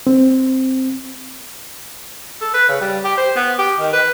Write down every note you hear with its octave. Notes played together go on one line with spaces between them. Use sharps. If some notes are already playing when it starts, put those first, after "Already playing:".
C4
A4
B4
C#3
G3
G4
C5
B3
G4
D#3
B4